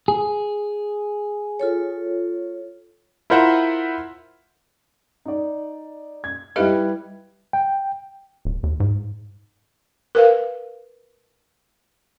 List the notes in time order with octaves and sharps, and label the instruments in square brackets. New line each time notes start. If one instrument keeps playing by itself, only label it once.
[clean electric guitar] G#4
[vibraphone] F4 A4 C#5
[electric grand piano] E4 F4 A#4 C5 E5 F#5
[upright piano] D#4 D5
G#6
[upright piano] G3 E4 B4 [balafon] G4 D#5 F5
[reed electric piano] G5
[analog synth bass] D1
D#2
G#2
[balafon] A#4 B4 F5